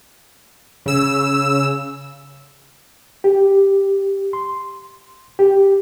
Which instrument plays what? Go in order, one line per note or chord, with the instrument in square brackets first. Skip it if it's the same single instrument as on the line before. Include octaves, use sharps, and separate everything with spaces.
[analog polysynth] C#3 E6
[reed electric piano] G4
C6
G4